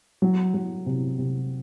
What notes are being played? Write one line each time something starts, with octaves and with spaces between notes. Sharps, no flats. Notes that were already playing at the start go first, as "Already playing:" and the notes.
F#3
F#3
C3
C3